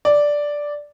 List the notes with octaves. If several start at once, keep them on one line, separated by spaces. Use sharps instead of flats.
D5